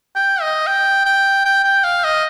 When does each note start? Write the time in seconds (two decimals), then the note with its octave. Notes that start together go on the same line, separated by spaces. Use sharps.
0.15 G5
0.41 D#5
0.67 G5
1.06 G5
1.45 G5
1.64 G5
1.83 F5
2.04 D#5